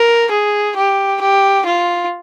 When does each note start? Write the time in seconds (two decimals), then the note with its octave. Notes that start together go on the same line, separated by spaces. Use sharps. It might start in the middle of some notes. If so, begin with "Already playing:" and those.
Already playing: A#4
0.31 G#4
0.77 G4
1.22 G4
1.66 F4